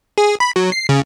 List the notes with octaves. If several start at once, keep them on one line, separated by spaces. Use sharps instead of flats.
G#4
B5
F#3
C7
C#3